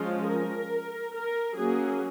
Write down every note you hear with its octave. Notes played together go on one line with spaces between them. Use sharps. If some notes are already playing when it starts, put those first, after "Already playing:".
Already playing: F3 G#3 C#4 F4
A#4
A#4
F#3 A#3 C#4 G#4